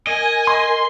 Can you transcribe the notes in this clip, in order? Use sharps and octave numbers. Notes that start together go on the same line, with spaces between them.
A#4 D#5 G#5
C6